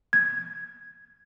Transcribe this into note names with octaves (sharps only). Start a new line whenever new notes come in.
G#6